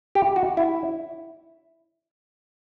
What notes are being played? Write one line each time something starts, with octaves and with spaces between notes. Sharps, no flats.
G4
F#4
E4